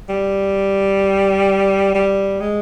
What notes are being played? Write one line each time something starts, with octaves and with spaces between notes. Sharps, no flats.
G3
G3
G#3